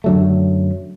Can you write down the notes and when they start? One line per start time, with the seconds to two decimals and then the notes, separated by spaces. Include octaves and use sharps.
0.04 F#2 D3 F#3 A3